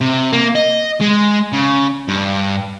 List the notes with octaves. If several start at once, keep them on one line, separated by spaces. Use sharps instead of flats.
C3
A#3
D#5
G#3
C#3
G2